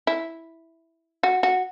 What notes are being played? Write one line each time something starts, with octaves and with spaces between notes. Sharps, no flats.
E4
F#4
F#4